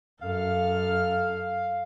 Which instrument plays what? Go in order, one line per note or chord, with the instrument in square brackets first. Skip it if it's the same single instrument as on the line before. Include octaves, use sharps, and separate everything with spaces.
[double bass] F#2 [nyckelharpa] A4 [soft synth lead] F5 [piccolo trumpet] F6